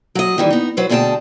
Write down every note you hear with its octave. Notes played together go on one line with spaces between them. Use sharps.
F#3 D#5
D#3 E3 G3
B3 D#4
F#3 B4 C5
D2 B2 G#4 C#5 G5 A5